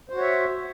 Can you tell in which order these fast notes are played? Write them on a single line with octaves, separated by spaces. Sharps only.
C5 F#4 C#5 E5